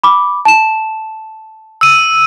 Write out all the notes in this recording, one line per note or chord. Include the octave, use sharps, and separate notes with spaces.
B5 D6
A5 E7
E6 D#7